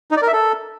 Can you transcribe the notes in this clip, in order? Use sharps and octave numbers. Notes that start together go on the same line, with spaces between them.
D#4
D5
A#4
E5
A4